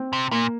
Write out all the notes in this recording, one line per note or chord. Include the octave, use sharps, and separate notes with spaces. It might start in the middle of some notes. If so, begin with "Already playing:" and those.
Already playing: C4
C3
A#2 A#3